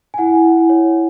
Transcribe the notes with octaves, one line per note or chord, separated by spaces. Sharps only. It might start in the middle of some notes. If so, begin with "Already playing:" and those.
G#5
E4 F#5
E4
C#5